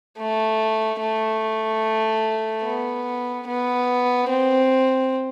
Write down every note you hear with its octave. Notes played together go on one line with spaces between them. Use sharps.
A3
A3
B3
B3
C4